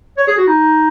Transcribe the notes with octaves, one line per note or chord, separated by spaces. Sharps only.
C#5
G#4
F#4
D#4